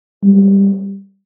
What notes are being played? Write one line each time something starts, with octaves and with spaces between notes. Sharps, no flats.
G3